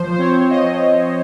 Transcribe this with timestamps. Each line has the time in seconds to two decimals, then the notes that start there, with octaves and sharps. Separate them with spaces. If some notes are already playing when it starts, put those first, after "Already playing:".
Already playing: F3 C5
0.12 C5
0.18 C4 C#5
0.50 F3 D#5
0.82 C4